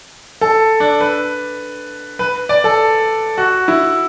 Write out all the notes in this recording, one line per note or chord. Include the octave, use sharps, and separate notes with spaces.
A4
D4
B4
B4
D5
A4
F#4
E4